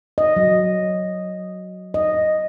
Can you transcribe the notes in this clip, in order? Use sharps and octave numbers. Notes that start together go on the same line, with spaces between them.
D#5
F#3
D#5